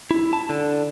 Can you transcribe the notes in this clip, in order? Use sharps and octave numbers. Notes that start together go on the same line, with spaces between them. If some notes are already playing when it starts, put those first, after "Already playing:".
E4
A5
D3